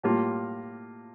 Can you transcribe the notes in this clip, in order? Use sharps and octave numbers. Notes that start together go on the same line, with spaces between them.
A2 G3 A#3 F4